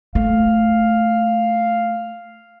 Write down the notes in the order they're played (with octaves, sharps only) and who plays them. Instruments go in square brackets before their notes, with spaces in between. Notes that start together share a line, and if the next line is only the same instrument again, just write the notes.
[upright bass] A3 [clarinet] F5